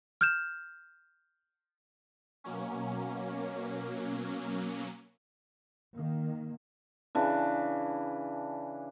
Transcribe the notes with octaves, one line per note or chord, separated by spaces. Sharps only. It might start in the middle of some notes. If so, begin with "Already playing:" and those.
F6 G6 E7
B2 F#3 A#3 C#4
D#3 A#3
C#3 E3 D4